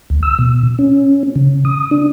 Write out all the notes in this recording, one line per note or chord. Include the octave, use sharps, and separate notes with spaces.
D2
E6
B2
C#4
C#3
D#6
D4